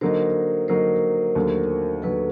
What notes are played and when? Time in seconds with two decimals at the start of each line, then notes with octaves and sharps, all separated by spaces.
0.01 D3 F#3 A#3 D#4 A#4 C5
0.68 D3 F#3 A#3 D#4 A#4 C5
1.35 D#2 D3 F#3 A3
2.02 D#2 D3 F#3 A3 A4 B4